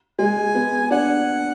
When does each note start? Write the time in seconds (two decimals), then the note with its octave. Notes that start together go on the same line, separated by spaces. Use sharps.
0.19 G#3 G#5
0.55 B3
0.90 D4 F#5